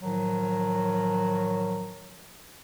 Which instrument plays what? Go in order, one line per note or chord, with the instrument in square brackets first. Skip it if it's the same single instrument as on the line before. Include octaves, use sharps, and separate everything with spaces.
[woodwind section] A2 D#3 F3 F#3